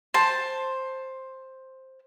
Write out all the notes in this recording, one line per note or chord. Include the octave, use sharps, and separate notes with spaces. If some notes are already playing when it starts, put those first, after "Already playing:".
C5 A5